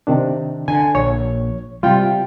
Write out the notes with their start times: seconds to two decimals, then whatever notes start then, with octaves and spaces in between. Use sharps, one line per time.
0.07 C3 D#3 D4
0.68 D3 G#5
0.95 A#1 C#5
1.83 C3 G3 F4 G5